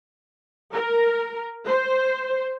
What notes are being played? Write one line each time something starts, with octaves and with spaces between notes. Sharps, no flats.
A#4
C5